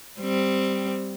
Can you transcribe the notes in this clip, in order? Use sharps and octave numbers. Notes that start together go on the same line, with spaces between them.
G3 C4